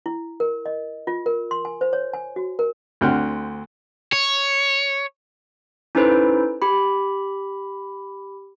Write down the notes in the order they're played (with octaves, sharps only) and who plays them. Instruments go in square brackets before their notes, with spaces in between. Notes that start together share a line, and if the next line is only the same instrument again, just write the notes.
[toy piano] E4
A#4
D#5
F4
A#4
C6
G#5
C5
C#5
G#5
F#4
A#4
[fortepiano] D2 D3 C4 F#5 G5 F6
[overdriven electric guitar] C#5
[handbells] C#4 D#4 E4 A4 B4 C5
G4 B5